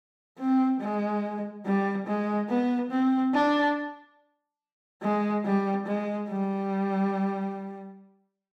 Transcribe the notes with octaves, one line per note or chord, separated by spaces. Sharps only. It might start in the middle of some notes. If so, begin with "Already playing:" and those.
C4
G#3
G3
G#3
B3
C4
D4
G#3
G3
G#3
G3